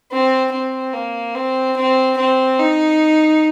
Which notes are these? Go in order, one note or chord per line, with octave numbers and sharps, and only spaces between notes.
C4
C4
A#3
C4
C4
C4
D#4